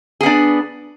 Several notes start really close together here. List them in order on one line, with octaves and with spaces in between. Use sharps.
G#4 B3 D4